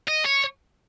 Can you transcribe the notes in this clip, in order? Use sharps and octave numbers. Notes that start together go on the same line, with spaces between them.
D#5
C#5